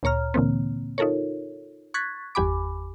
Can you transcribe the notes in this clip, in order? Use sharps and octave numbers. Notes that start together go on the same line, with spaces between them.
D2 A#2 C#5 A#5 F6
A#2 D3 E3 A#3 C4
D#4 F4 A4 A#4 C#5
C#6 F#6 G#6 A6 B6
G1 E2 G4 G#5 B5 D6